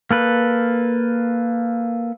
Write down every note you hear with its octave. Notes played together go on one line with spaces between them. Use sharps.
A#3 A4 B4